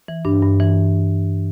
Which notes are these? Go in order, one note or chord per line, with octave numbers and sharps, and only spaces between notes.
E3
G2 D4
G2
E3